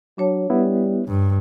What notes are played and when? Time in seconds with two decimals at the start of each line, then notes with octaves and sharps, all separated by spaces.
0.18 F#3 D4 C#5 A5
0.50 G3 B3 E4
1.08 G2